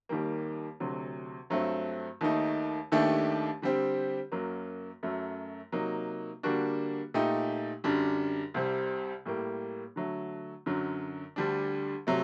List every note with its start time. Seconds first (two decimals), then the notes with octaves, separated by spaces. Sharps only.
0.09 D#2 D#3 G3 A#3
0.80 D2 C3 F#3
1.50 G2 F#3 A3 C4
2.21 D#2 D#3 A3 D#4
2.92 D#2 D#3 A3 D4 G4
3.62 D3 G3 C4 G4
4.32 F#2 F#3 A#3
5.03 F#2 F#3 A3
5.72 C3 F#3 A#3 D#4
6.43 D3 G3 A#3 D4 F#4
7.14 A#2 A3 D#4 G4
7.84 F#2 D3 G3 D4
8.54 C2 C3 G3 C4
9.26 A2 G3 A#3
9.96 D3 F#3 A3
10.66 F#2 D3 F#3
11.36 D2 D3 G3 D4
12.07 C3 F#3 A3